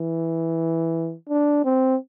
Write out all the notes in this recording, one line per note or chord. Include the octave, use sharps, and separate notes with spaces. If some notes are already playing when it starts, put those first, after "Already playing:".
Already playing: E3
D4
C4